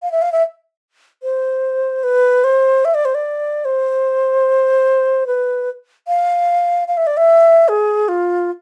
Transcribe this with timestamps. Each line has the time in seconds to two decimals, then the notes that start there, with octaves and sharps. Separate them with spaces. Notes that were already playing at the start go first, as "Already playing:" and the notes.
0.03 F5
0.12 E5
0.22 F5
0.32 E5
1.23 C5
2.04 B4
2.44 C5
2.85 E5
2.94 D5
3.05 C5
3.15 D5
3.65 C5
5.27 B4
6.08 F5
6.88 F5
6.97 E5
7.07 D5
7.17 E5
7.68 G#4
8.08 F4